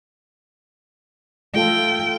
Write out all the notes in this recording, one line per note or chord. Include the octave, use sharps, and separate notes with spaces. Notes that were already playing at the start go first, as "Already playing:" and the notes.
A3 F4 A4 G5